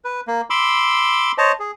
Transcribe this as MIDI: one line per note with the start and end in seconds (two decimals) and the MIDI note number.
0.04 0.21 71
0.28 0.41 58
0.50 1.32 83
0.50 1.32 84
0.50 1.32 86
0.50 1.32 88
1.38 1.52 72
1.38 1.52 73
1.38 1.52 75
1.38 1.52 81
1.60 1.71 68